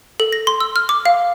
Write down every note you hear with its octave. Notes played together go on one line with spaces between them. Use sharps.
A4
A#6
C6
E6
F6
D6
F5